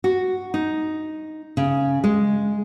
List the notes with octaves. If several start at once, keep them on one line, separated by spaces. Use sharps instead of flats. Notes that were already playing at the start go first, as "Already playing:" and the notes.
F#4
D#4
C#3
G#3